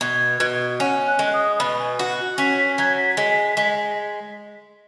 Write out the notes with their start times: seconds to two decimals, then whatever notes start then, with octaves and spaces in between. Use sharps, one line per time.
0.01 B2 G#6
0.40 B2
0.80 C#4 F#5
1.07 F#6
1.19 G#3
1.33 D#6
1.59 B2 B5
1.79 G#5
1.99 F#4 F#5
2.38 C#4 B6
2.58 B6
2.78 F#3 G#6
2.97 B6
3.17 G#3 B6
3.57 G#3